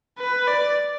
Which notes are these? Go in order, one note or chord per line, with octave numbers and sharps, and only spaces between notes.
B4
D5